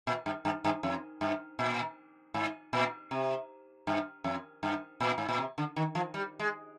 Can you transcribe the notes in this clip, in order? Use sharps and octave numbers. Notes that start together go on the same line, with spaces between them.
A#2
G2
G2
G2
F2
G2
A#2
G#2
A#2
C3
G2
F2
G2
A#2
G#2
A#2
C3
D3
D#3
F3
G3
G#3